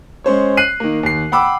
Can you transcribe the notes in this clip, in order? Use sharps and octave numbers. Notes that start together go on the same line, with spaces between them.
G#3 C#4 C5 C#5
F#6 C7 D#7
D#3 A#3
D#2 C7
F#5 G5 B5 D6 E6